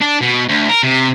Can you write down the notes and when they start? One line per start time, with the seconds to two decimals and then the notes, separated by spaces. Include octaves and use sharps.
0.02 D4
0.22 B2
0.49 D2
0.69 A#4
0.83 C3